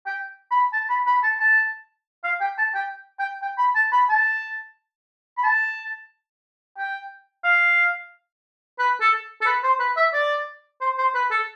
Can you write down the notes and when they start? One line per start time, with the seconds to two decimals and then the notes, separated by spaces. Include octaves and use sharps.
0.06 G5
0.51 B5
0.73 A5
0.89 B5
1.07 B5
1.23 A5
1.40 A5
2.24 F5
2.41 G5
2.58 A5
2.74 G5
3.19 G5
3.42 G5
3.58 B5
3.75 A5
3.92 B5
4.09 A5
5.37 B5
5.43 A5
6.78 G5
7.44 F5
8.79 B4
9.01 A4
9.41 A4
9.46 B4
9.63 C5
9.79 B4
9.96 E5
10.13 D5
10.81 C5
10.98 C5
11.15 B4
11.31 A4